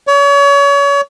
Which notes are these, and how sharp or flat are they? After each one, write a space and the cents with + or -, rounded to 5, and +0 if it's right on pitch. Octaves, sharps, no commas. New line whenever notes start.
C#5 +35